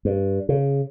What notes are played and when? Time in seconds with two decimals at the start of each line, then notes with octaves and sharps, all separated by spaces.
0.05 G2
0.49 C#3